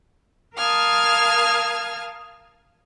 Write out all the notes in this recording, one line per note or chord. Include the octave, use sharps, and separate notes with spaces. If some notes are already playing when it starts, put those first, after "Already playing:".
A#4 F5 A5 D#6 F6 G#6